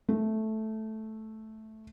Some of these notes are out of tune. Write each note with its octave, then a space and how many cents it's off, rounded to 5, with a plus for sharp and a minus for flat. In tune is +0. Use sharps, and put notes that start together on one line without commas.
A3 -5